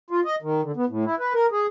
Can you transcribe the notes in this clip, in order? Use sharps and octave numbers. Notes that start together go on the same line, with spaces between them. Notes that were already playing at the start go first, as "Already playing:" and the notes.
F4
D#5
D#3
D3
B3
A2
E4
B4
A#4
G#4